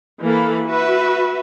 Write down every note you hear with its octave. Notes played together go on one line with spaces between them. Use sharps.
E3 A#3 A4 F5 B5
F#4 B4 E5